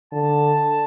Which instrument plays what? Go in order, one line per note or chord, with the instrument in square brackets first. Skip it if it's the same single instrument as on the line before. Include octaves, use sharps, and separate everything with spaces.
[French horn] D3 [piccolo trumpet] A5